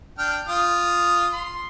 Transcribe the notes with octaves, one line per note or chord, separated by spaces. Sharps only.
D4 G5 F6
F4 D#6
C6